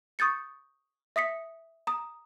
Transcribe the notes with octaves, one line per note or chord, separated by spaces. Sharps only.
C#6 D#6 G6 A6 C#7
E5 D#6 B6 C#7
A#5 D#6